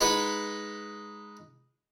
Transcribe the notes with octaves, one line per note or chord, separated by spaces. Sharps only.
G#3 D#4 B4 F#5 B5 D#6